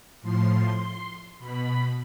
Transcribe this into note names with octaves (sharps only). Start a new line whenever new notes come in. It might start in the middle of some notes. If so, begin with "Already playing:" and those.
A2 F3 C6
B2 B5